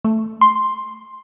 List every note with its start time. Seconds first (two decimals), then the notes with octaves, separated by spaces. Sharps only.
0.04 A3
0.41 C6